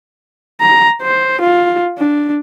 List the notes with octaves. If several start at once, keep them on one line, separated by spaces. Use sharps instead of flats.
A#5
C5
F4
D4